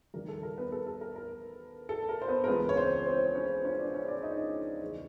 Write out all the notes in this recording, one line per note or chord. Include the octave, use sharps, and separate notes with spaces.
D#2 D#3 G3 A#4
A4
A#4
B3 B4
A4
A4
A#4
A#4
A4
A#4
C5
B3 B4
A#4
C#2 C#3 E3 G#3 B3 B4
C#5
C4 C5
C4 C5
C#4 C#5
C#4 C#5
D4 D5
C#4 C#5
D4 D5
D#4 D#5
E2 C#3 E3 A3